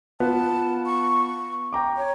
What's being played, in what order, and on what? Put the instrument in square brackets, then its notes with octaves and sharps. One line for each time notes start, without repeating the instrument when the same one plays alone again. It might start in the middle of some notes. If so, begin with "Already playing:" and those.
[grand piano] B3 F4 [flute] A5
[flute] C#6
[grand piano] G5 A#5 D6
[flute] C#5